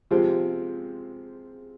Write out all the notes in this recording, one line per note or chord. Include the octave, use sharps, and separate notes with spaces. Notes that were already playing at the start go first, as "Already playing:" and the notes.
C3 F3 G#3 C4 F4